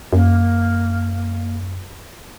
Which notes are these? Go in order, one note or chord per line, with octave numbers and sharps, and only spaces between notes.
F#2 A#3